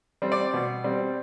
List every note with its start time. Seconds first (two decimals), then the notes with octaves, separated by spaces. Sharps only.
0.22 G3 C4
0.32 D5
0.53 B2
0.84 G3 C4